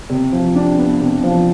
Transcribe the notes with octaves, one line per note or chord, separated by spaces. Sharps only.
C3
F3
D4
B3
C3
F3